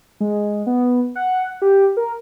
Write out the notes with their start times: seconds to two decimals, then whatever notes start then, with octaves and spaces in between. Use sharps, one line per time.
0.20 G#3
0.67 B3
1.16 F#5
1.62 G4
1.97 A#4